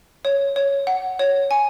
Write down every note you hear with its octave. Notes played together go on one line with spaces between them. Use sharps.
C#5
C#5
F#5
C#5
G#5